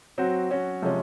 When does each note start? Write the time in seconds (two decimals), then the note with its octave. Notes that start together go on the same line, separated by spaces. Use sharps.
0.18 F#3 C4 F#4
0.50 F#3 C#4 F#4
0.82 C3 F3 G#3 C#4